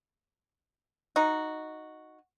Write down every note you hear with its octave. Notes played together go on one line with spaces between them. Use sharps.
D#4 F#4